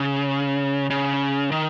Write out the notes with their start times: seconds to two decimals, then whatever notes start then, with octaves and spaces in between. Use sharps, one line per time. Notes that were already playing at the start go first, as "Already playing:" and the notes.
Already playing: C#3
0.90 C#3
1.51 D#3